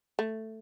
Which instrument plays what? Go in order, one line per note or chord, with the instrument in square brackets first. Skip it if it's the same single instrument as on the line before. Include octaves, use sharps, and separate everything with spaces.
[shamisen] A3